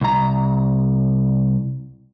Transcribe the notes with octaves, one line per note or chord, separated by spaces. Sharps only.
C2 A#5